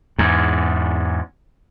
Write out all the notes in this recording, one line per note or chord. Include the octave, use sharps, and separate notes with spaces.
E2 G#2